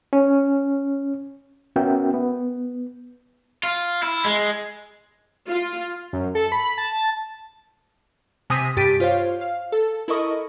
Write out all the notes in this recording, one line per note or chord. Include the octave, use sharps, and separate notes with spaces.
C#4
B3 C#4 F#4 A#4 E5 G5
B3
F4
E4
G#3
F4
F#2
A4
B5
A5
A5
C3 G#5 D#6 A#6 B6 D#7
G2 G4 A6 B6 D7 D#7
F4 C5 C#5 F5
F5
A4
E4 A4 A#4 D#5 C#6 D#6